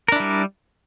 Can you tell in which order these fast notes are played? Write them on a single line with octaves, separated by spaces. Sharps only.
A#4 D4 E4 G3